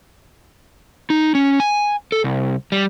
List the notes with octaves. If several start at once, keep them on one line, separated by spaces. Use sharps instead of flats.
D#4
C#4
G#5
A4
C2
G3